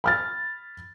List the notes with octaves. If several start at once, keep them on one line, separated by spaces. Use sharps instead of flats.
B5 F6 A6